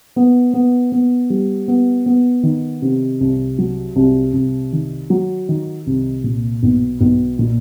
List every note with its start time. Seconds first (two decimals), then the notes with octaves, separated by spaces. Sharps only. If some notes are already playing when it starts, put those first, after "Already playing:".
0.16 B3
0.54 B3
0.92 B3
1.30 G3
1.68 B3
2.06 B3
2.43 D#3
2.82 C3
3.21 C2
3.58 F#3
3.96 C2
4.33 C2
4.73 D#3
5.10 F#3
5.49 D#3
5.87 C2
6.24 A#2
6.63 B1
7.01 B1
7.39 A#2